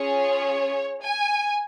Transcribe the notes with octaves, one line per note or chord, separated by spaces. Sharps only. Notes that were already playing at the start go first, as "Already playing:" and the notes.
Already playing: C#4 F4 G#4 C#5
G#5